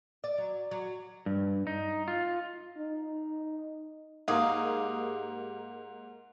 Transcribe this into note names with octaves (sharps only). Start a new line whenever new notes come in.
D5
F#3
F#3
G2
D#4
F4
D#4
G#2 A#3 G4 G#4 F5 A#5